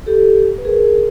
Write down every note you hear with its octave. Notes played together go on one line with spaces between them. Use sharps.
G4 A4
B4
G#4 A#4